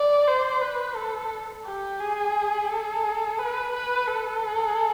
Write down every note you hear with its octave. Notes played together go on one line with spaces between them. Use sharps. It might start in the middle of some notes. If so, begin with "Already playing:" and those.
Already playing: D5
C5
B4
A4
G4
G#4
A4
B4
B4
A4